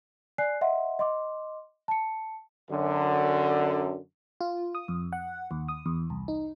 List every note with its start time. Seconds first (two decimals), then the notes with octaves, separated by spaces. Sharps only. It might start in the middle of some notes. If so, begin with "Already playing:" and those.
0.38 D5 G#5 F#6 C7
0.61 D#5 E5 F#5 C6
0.99 D#5 C6 D6
1.88 A5 C#7
2.70 F#2 D3
4.41 F4
4.75 D#6
4.88 F2
5.13 F#5
5.51 D#2
5.68 D#6
5.86 E2
6.10 C2
6.28 D#4